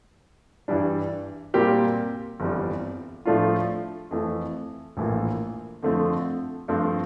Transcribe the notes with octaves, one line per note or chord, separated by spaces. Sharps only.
G2 E3 G3 D4
A#2 G3 C4 G4 A#4
G1 F2 E3 G3
A2 F3 A3 D4 F4
F2 E3 A3
A#1 A2 E3 A#3 F4
F2 D3 F3 A3 C4
G2 F3 A3 C4